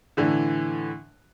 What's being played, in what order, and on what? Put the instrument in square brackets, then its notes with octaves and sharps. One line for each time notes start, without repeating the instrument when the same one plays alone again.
[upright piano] A2 D3 E3